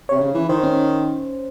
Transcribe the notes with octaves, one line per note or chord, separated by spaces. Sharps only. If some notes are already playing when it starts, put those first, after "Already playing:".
C3 C#5
C#3
E3
D#3 C5
C#4